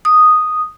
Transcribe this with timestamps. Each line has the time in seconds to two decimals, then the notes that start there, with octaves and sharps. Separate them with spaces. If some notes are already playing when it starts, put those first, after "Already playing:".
0.05 D#6